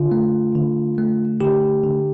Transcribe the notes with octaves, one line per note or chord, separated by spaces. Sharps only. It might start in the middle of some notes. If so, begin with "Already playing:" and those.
Already playing: D3 F4
A3
D3
A3
D3 G4
D3